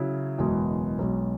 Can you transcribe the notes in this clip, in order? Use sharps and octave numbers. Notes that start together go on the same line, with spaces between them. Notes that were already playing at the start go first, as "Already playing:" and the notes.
Already playing: C#3 F#3 E4 G#4
F#1 E2 B2 G#3
B1 B2 G#3